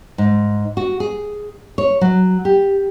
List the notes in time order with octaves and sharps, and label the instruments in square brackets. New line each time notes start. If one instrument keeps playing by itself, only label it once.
[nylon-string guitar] G#2
F#4
G#4
C#5
F#3
G4